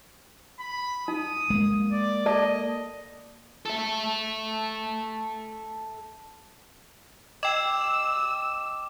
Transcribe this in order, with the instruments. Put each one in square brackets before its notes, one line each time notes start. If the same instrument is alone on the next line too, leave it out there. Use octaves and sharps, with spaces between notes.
[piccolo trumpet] B5
[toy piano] D#4 [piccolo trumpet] D#6
[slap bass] G#3 A#3
[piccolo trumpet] D5
[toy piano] A4 D5 A5 [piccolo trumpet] D#5
[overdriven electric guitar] A4 E5
[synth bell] D#5 G5 [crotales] D6 E7 [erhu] E6